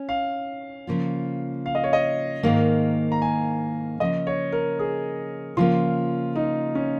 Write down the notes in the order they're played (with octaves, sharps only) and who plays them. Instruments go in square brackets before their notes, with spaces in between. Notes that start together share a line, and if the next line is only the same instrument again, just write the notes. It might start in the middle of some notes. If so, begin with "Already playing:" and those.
Already playing: [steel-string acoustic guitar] C#4
[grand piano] F5
[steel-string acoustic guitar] C#3 F3 A#3 F4
[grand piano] F5
D#5
C#5
D#5
[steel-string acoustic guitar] G#2 D#3 A#3 [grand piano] F5
[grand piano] A#5
G#5
[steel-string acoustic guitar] C#3 F3 A#3 [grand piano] D#5
[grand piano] C#5
A#4
G#4
[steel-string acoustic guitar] C#3 F3 A#3 [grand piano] F4
[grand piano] D#4
C#4